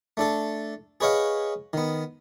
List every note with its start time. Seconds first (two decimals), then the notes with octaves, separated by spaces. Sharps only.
0.17 A3 D4 A4
1.01 G#4 B4 C#5 D#5 F5 F#5
1.73 D#3 B3